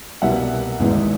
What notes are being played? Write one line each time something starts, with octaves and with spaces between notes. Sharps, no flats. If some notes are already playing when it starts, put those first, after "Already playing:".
C2 B2 G3 A#3 E5 F#5
G#1 G#2 E3 G#3